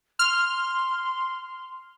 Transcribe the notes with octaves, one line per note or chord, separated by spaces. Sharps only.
C6 F6